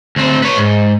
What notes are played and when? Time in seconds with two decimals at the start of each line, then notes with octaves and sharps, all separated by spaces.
0.16 D2 C4
0.42 B4 C#5
0.57 G#2